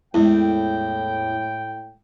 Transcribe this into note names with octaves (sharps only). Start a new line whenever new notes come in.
E2 A2 G#3 E4 G5